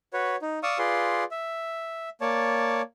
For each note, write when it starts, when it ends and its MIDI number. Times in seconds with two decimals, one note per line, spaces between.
0.13 0.36 66
0.13 0.36 71
0.13 0.36 73
0.42 0.59 63
0.63 0.78 74
0.63 0.78 77
0.63 0.78 85
0.63 0.78 87
0.63 0.78 88
0.78 1.24 65
0.78 1.24 68
0.78 1.24 71
0.78 1.24 74
0.78 1.24 84
1.31 2.09 76
2.21 2.82 58
2.21 2.82 73
2.21 2.82 74
2.21 2.82 81